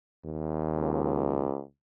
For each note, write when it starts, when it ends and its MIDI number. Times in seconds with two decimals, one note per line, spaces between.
0.24 1.47 39
0.77 1.63 37